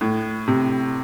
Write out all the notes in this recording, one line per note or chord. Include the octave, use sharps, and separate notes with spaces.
A2
C3